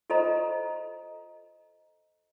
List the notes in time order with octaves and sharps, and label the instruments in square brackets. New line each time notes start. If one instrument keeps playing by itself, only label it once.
[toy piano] F4 A4 C5 D#5 A#5